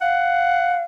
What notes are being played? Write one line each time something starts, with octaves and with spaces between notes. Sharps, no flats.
F5 F#5